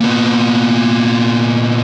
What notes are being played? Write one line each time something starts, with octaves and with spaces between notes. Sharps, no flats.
A#2 B3